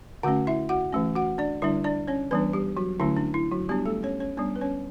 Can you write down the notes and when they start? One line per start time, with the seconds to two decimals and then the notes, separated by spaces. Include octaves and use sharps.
0.23 D3 A3 C#4 F#4 F#5
0.47 E4 E5
0.69 F#4 F#5
0.92 E3 A3 C#4
1.15 F#4 F#5
1.38 D4 D5
1.62 D3 G3 D4 E4 E5
1.84 D4 D5
2.08 C#4 C#5
2.31 E3 G3 B3 D4 B4
2.53 G3 G4
2.77 F#3 F#4
3.00 D3 F#3 A3 C#4 E4
3.17 D4
3.34 E4
3.51 F#3 F#4
3.69 G3 B3 D4 G4
3.86 A3 A4
4.03 C#4 C#5
4.20 C#4 C#5
4.37 G3 B3 D4
4.56 B4
4.61 C#4 C#5